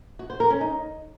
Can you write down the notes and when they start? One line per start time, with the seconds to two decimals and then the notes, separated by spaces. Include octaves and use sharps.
0.19 F#4
0.30 C5
0.40 A#4
0.50 C#4
0.61 D#4